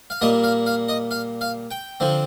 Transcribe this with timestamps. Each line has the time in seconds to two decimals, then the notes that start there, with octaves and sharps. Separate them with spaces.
0.10 F5
0.21 A#2 G3 A#3 D#5
0.44 F5
0.66 F5
0.88 D#5
1.11 F5
1.41 F5
1.71 G5
2.00 D3 F3 C4